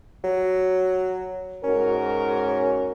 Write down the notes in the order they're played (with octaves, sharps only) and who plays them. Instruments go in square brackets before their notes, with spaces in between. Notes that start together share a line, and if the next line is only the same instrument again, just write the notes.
[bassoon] F#3
[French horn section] G#2 F#4 A#4 [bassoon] C#4